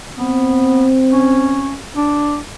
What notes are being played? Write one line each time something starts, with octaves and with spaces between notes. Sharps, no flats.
B3 C4
C#4
D4